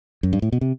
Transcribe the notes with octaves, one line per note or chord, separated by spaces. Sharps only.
F#2
G2
A2
B2
C3